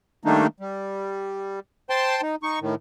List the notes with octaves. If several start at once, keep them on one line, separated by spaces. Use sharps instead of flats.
D#3 G3 A3 A#3 D4 D#4
G3
C5 G5 A5 C6
D#4
D#4 C#6
A2 D#3